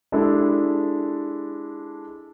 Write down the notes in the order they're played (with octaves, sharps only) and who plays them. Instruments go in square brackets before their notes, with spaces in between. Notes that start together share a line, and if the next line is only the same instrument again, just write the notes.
[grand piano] G#3 D4 E4 G4 A4